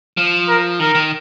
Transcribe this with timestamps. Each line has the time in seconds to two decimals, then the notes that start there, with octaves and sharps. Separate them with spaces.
0.17 F3
0.48 A#4
0.80 D#3 A#4
0.95 D#3